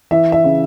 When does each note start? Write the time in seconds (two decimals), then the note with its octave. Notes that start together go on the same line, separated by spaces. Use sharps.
0.11 E3 E5
0.32 E5
0.44 C#3